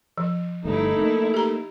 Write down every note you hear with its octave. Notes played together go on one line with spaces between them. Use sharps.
F3
G1 G2 A3 D#4 E4
A#3
G4 A#5